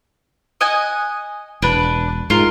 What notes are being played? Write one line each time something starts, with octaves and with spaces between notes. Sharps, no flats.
D#5 F#5 G#5
E1 D4 B4
G#2 F4 A#4